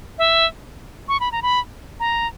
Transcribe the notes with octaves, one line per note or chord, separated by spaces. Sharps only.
E5
C#6
B5
A#5
B5
A#5